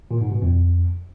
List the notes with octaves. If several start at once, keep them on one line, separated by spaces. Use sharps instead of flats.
A#2
G#2
B2
F2